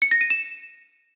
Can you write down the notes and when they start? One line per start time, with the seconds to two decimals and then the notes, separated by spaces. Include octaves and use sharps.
0.02 C#7
0.11 A#6
0.21 D#7
0.30 E7